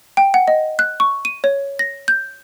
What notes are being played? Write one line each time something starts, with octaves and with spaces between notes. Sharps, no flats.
G5
F#5
D#5
F#6
C#6
D#7
C#5
A#6
G6